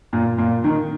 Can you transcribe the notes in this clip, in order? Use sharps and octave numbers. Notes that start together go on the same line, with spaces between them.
A#2
A#2
D#3